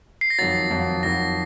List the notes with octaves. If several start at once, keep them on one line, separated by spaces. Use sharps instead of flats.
C7
A#6
F2 D#3 F#3 A6
F2 D#3 F#3
F2 D#3 F#3 A#6